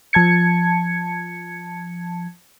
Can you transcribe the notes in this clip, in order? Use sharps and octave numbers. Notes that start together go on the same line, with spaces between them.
F3 A5 G#6 C#7